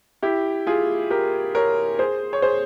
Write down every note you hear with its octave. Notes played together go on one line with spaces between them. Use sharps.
E4 G4
F4 G#4
G4 A#4
A#4 C#5
G#4 C5
C#5
G#4 C5